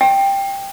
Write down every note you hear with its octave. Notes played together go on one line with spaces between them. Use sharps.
G5